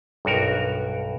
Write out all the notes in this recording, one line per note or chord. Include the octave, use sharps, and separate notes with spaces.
B1 G2 F#4 A#4